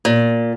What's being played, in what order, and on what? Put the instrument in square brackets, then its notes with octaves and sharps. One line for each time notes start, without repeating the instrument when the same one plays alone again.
[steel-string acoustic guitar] A#2